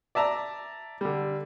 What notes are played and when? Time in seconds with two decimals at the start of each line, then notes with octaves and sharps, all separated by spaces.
0.15 D5 E5 A5 A#5
1.01 D3 G3